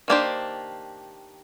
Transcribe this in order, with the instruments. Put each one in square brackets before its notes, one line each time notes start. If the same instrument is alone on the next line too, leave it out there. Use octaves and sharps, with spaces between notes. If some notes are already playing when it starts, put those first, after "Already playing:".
[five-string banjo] D#3 A#3 D4 G4 C5